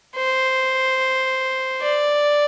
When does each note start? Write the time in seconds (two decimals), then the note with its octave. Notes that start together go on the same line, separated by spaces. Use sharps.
0.16 C5
1.81 D5